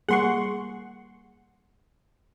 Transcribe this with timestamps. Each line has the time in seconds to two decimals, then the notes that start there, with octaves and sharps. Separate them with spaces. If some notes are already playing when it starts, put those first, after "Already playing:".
0.09 G3 A#3 G#4 F#5 C6 C#6